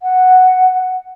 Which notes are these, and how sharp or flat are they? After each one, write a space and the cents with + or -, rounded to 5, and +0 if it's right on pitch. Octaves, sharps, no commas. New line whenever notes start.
F#5 +0